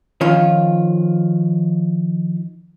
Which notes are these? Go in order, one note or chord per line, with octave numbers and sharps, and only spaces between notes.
D#3 F3 C#4 F4